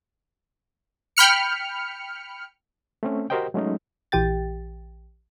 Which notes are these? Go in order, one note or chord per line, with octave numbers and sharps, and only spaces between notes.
G5 B5 F6 C#7
A3 C4 C#4
F#4 G4 A#4 C5 D#5 G5
F#3 G#3 A3 C#4 D#4
A#1 E3 G4 G5 A6